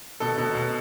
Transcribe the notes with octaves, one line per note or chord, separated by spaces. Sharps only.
B2 A4
B2
B2